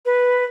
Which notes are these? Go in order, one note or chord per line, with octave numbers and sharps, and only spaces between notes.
B4